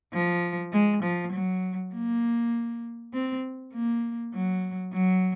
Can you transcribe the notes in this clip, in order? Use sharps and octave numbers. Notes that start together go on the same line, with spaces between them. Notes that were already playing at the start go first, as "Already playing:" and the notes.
F3
G#3
F3
F#3
A#3
C4
A#3
F#3
F#3